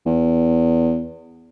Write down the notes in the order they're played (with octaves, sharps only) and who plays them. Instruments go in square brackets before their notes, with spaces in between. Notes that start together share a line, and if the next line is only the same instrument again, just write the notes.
[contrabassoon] E2